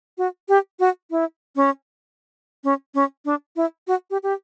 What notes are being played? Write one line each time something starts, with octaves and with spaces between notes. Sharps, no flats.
F#4
G4
F#4
E4
C#4
C#4
C#4
D4
E4
F#4
G4
G4